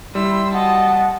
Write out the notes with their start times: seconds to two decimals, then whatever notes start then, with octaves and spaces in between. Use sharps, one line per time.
0.15 G3 E4 C6 E6
0.53 F#4 D#5 F#5 A5